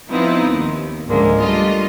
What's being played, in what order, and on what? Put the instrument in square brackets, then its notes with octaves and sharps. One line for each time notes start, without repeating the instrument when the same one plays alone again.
[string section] F3 B3 C4 D#4 E4
D#2
C#2 G#2 D3 F3 G#3 A#3
G3 A3 D4 F4 D#5